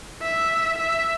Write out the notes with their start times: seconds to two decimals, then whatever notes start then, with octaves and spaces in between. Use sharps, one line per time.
0.23 E5
0.78 E5